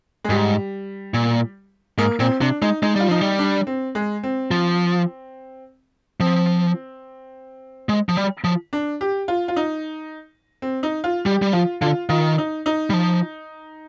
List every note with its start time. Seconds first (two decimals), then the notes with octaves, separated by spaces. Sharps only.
0.24 G#3
0.29 G#2 G3
1.14 A#2
1.98 G#2 A#3
2.20 A#2 C4
2.41 C3 D4
2.62 G#3 D#4
2.83 G#3 D#4
2.96 G3 F4
3.08 F3 D#4
3.21 G3
3.39 D4
3.67 C4
3.95 G#3
4.23 C4
4.51 F3
6.20 F3 C4
7.89 G#3
8.09 F3
8.17 G3
8.44 F3
8.73 D4
9.01 G4
9.28 F4
9.48 F4
9.56 D#4
10.62 C4
10.83 D#4
11.04 F4
11.25 G3 G4
11.42 G3
11.53 F3 F4
11.81 D3 F4
12.09 D#3 F4
12.38 D#4
12.66 D#4
12.90 G3
12.94 F3